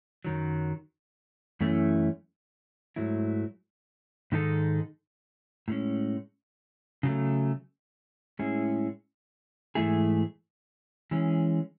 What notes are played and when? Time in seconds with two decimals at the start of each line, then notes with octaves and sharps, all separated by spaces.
0.25 F#2 D#3 F#3
1.61 F#2 E3 A3 C#4 E4
2.96 G#2 F#3 A3 E4
4.32 G#2 D#3 G#3 D#4 A4
5.68 A2 G#3 C#4
7.03 C#3 F#3 A3
8.39 A2 G#3 C#4 E4 G#4
9.75 G#2 E3 A3 E4 G#4
11.11 E3 G#3 C#4 G#4